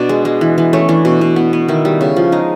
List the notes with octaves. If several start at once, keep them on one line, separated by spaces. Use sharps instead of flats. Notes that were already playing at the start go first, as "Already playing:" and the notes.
Already playing: B2 D4
G#3
G#3
E3
E3
A3 C#4
E3 D4
B2
B2
B3
B3
D#3 E4
G3
C#3
F3
G#3 D#4